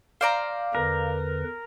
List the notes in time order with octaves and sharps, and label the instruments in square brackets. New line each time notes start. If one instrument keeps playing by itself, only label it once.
[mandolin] C5 D5 A#5 [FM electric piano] F5
[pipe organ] E2 D3 B4 [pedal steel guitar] A#4